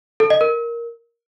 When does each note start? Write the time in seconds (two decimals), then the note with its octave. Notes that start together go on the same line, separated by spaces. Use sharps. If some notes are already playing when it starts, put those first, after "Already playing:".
0.20 A4
0.30 D#5
0.41 A#4